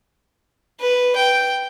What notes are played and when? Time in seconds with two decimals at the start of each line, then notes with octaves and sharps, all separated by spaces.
0.81 B4
1.16 G5